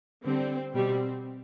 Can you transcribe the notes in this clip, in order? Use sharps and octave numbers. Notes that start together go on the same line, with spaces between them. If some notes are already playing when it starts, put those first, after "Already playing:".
D3 G3 C4
B2 G3 C4